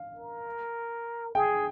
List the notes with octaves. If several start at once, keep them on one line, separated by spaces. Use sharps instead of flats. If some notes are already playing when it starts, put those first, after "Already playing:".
Already playing: F5
A#4
G#4 G5